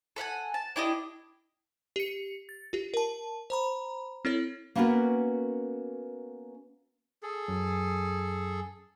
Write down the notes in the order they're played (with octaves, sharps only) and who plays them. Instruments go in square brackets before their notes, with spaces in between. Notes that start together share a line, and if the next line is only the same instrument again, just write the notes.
[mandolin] A4 E5 F#5 G#5
A5
D4 E4 G4 D#5
[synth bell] G4 C#7
A6
F4 G4
A#4 A5
C5 A#5 B5
C4 E4 A4 C#5
[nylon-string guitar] A#3 B3 C#4 F#4 A#4 B4
[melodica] G#4 A4
[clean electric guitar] F#2